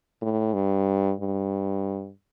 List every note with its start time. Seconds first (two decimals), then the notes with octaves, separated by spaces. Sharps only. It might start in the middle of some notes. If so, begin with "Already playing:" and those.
0.22 A2
0.54 G2
1.20 G2